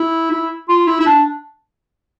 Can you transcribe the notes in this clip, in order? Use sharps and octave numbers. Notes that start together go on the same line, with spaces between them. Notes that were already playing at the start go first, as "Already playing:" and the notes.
Already playing: E4
E4
F4
E4
E4
D4